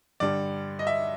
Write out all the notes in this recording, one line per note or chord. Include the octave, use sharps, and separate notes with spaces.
G2 D3 G3 D5
D#5
E5